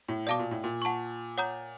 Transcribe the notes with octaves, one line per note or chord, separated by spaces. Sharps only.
A2
B2 D5 F5 A5 D6
A#2
A2
A#2
F#5 A5 C#6
C#5 F#5 A#5 D#6 G6